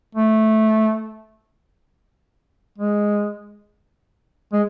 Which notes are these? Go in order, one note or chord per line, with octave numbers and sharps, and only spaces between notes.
A3
G#3
G#3